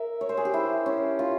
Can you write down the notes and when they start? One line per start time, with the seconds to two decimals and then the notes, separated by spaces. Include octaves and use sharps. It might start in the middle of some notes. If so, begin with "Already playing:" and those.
Already playing: A#4 E5
0.21 C#5
0.29 C5
0.37 G#4
0.45 G4
0.54 E4
0.86 C#4
1.19 F4